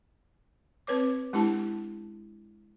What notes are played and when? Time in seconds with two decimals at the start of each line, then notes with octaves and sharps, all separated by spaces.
0.87 C4 B4 C#5 D6
1.33 G#3 D4 E4 G4 A5